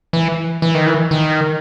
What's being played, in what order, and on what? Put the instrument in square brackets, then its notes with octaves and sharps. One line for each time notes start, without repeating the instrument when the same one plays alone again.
[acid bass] E3
E3
D#3
E3
D#3